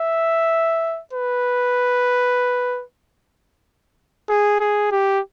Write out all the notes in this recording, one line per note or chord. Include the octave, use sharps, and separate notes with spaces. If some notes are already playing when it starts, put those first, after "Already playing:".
Already playing: E5
B4
G#4
G#4
G4